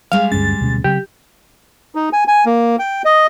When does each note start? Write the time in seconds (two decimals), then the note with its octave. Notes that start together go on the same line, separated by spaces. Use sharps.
0.12 G3 G#3 F5
0.32 D2 G2 C#4 A6
0.61 D2 B2 C#4
0.84 C#3 F#3 C4 G4
1.95 D#4
2.13 G#5
2.28 G#5
2.46 A#3
2.79 G5
3.05 D#5